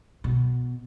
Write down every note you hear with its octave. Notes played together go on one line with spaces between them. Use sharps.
B2